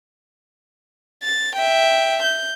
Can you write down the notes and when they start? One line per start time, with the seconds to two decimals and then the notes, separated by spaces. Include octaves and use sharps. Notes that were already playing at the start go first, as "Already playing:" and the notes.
1.23 A6
1.56 E5 G5
2.23 G6